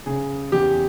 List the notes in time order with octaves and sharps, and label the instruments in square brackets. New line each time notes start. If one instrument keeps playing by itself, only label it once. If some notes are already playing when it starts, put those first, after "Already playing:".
[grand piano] C#3 G#4
E2 G4